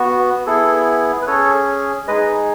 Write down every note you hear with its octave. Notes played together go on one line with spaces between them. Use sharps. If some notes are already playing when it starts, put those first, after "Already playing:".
Already playing: B3 F#4
B3 E4 G#4 A4
B4
C#4 G#4 A4 C#5
G#3 D#4 G#4 B4 D#5